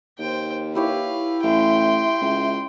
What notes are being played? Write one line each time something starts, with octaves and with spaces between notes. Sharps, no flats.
D#2 C5 G5
E4 G4 B4 C#5 F5
A1 E5 G5 C6
C#2